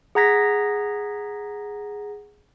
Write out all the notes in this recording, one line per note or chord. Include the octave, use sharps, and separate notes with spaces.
G#4 F#5 A#5 G#6 A#6 B6